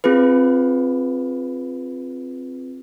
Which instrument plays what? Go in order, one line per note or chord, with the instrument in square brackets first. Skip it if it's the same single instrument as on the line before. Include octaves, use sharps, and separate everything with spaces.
[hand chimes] C4 F4 G#4 B4